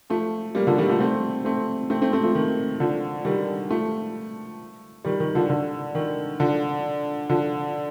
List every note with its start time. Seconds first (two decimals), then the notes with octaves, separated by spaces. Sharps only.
0.10 F3 A3
0.55 G3 A#3
0.67 D3 F3
0.78 D#3 G3
0.89 F3 A3
1.00 A3 C4
1.45 A3 C4
1.90 A3 C4
2.02 A3 C4
2.13 A3 C4
2.23 F3 A3
2.35 D#3
2.80 D3 F3
3.25 D#3 G3
3.70 F3 A3
5.05 D#3 G3
5.20 D#3
5.35 D3 F3
5.50 D3
5.95 D#3
6.40 D3 F3
7.30 D3 F3